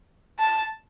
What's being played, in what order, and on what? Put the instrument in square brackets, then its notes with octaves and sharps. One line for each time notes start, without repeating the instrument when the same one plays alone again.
[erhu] A5